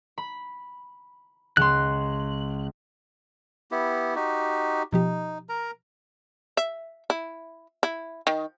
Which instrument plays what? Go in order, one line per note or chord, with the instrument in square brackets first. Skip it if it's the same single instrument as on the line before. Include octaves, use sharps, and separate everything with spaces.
[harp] B5
[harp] C#2 G#3 C6 [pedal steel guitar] F#6
[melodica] B3 E4 G4
D#4 F#4 G4
[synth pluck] B2 F3 G4 [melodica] D#4
[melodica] A#4 A#5
[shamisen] E5
E4
E4
D#3